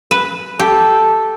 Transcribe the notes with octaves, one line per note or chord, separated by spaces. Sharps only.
B4
G4 A4